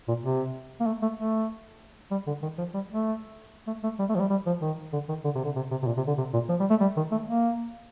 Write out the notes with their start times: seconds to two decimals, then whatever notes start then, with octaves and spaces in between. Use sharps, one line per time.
0.08 A#2
0.24 C3
0.80 A#3
0.87 A3
1.02 A3
1.17 A3
2.11 G3
2.27 D3
2.42 D#3
2.58 F3
2.74 G3
2.89 A3
3.67 A3
3.83 A3
3.99 G3
4.09 A3
4.15 F3
4.20 G3
4.30 G3
4.46 F3
4.62 D#3
4.93 D3
5.09 D#3
5.24 D3
5.35 C3
5.45 D3
5.56 C3
5.71 C3
5.82 C3
5.87 A#2
5.97 C3
6.07 D3
6.18 C3
6.33 A#2
6.49 F3
6.60 G3
6.70 A3
6.81 G3
6.97 D#3
7.12 A3
7.27 A#3